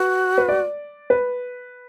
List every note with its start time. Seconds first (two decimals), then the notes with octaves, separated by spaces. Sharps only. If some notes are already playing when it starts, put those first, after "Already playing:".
Already playing: F#4 B4
0.38 B4
0.49 D5
1.10 B4